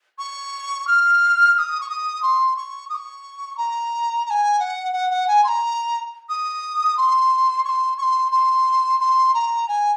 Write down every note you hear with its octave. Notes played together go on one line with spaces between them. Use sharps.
C#6
F6
F6
D#6
C#6
D#6
C6
C#6
D#6
C#6
A#5
A#5
G#5
F#5
F#5
F#5
G#5
C6
A#5
D#6
C6
C#6
C6
C#6
C6
C6
C6
A#5
G#5